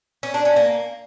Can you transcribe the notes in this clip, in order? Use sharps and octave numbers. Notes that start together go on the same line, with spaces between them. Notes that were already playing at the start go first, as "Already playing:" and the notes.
C#4
D4
C#4
A#3